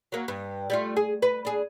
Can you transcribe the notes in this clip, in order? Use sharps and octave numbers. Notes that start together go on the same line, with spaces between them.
F#3 A#3
G2
G3 A3 F4
G#4
B4
D4 G#4